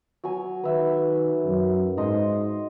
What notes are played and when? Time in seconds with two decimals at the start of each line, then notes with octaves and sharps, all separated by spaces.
0.24 F#3 G#5
0.64 D#3 B4 E5
1.45 F#2
1.97 G#2 D#4 D#5 C6